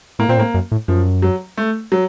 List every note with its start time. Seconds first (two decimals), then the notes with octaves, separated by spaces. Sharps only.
0.19 A2 A#3
0.29 A#2 C4
0.37 A2 A#3
0.54 F#2
0.72 A2
0.88 F#2 F3
1.22 F#3
1.57 A3
1.92 F#3